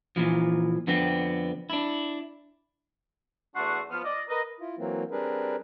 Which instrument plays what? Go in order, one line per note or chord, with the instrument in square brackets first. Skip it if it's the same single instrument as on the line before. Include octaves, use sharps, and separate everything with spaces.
[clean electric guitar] A#2 E3 F3
F2 D3 B3 C4
D4 E4
[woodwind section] E2 A3 D4 F#4 F#5 C6
F3 B3 F6
D5 D#5
A#4 B4 D#5
[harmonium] E4 F4
E3 F#3 A#3 C4
G3 C4 D4 G#4 A#4 B4